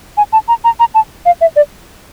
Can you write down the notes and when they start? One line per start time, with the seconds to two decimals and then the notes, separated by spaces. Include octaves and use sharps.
0.17 G#5
0.33 A5
0.48 A#5
0.64 A#5
0.80 A#5
0.94 A5
1.26 F5
1.41 E5
1.56 D5